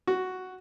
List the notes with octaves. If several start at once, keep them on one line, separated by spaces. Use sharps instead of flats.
F#4